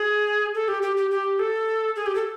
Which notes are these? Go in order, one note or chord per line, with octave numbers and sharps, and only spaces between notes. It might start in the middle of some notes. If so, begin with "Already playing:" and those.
Already playing: G#4
A4
G4
G4
G4
G4
A4
G#4
G4
A4